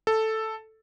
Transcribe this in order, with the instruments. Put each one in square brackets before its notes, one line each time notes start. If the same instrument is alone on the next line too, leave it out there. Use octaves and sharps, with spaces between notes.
[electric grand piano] A4